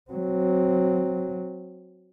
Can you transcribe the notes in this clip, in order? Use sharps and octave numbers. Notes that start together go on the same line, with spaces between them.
F#3 C4